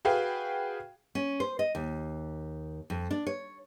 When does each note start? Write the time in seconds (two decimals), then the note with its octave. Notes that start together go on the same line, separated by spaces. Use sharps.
0.05 F#4 G#4 B4 F5 G5
1.15 C#4
1.40 C5
1.59 D#5
1.75 D#2
2.90 F2
3.11 D4
3.26 C#5